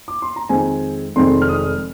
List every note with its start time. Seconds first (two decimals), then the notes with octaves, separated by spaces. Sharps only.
0.08 D6
0.22 C6
0.36 A#5
0.49 F2 D#3 G#3 C4 G#5
1.16 F1 F2 D#3 G#3 C4 C6
1.42 F6
1.49 D#6